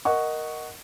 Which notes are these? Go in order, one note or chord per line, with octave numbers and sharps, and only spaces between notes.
A#4 D#5 F#5 C#6